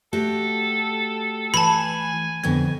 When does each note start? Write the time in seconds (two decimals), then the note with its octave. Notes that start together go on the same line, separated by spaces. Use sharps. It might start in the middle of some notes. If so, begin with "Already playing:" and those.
0.13 A3 F#4 G4 A4
1.54 E3 G#5 A5 B5
2.44 F2 B2 D3 G#6